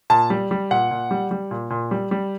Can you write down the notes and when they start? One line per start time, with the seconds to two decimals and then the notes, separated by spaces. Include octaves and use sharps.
0.10 A#2 A5
0.30 G3
0.51 G3
0.71 A#2 F#5
0.91 A#2
1.11 G3
1.31 G3
1.51 A#2
1.70 A#2
1.91 G3
2.11 G3